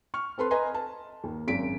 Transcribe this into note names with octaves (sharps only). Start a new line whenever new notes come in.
C#6 F6
C4 A4 B4 C6
B4 D#5 G#5 A#5 C6
A5
D#2
G#1 F#2 B6 D7